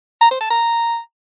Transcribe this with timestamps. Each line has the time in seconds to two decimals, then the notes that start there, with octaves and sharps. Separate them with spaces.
0.21 A#5
0.31 C5
0.41 A5
0.51 A#5